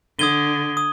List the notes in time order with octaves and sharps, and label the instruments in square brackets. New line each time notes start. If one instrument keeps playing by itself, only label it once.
[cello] D3 [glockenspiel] D#6 G#6 D#7 G7
[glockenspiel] D#6